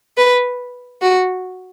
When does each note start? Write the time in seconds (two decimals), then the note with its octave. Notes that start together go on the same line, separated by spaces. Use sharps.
0.17 B4
1.02 F#4